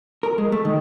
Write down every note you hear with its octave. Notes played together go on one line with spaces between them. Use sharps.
A#4
G#3
A3
D#3